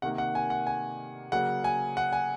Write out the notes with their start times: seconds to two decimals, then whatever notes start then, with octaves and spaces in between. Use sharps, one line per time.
0.02 C3 D#3 A#3 F#5
0.18 F#5
0.35 G#5
0.50 F#5
0.67 G#5
1.32 C#3 F#3 A#3 F#5
1.64 G#5
1.97 F#5
2.13 G#5